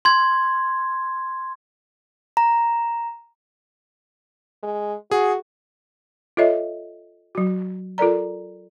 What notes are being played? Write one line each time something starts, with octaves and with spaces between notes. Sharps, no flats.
C6 G#6
A#5
G#3
F#4 G#4
F4 A4 C#5 D#5 E5
F#3 F#4
F4 A4 A#4 D5 A#5